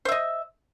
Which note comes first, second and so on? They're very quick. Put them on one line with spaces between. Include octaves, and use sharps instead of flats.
C5 E5 D#5